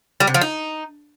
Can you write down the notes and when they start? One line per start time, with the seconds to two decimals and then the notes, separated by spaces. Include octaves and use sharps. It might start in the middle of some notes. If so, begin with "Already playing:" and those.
0.20 G3
0.27 C3
0.34 F3
0.41 D#4